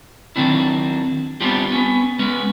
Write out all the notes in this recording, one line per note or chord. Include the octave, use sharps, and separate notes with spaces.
D#3 F#3 G3 C4 D4 E4
G3 B3 C4 D4 F4 G4
B3 C#4
G#3 B3 C#4